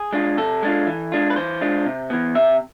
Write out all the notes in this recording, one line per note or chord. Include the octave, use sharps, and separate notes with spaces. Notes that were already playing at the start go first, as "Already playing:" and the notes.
Already playing: G#4
G#3 D4 F4
C3 A4
G#3 D4 F4
E3
G#3 D4 F4
B4
E3 C5
G#3 D4 F4
C3
E3 B3
C3 E5